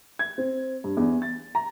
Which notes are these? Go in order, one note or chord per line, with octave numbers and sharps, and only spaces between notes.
G#6
C4
G2
E2
A6
A#5